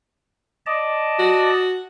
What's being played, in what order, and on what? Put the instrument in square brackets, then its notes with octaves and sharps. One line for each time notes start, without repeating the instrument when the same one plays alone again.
[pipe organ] D5 D#5 A5
[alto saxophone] F#4